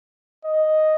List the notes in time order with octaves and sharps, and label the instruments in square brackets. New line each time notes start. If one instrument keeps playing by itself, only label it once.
[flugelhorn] D#5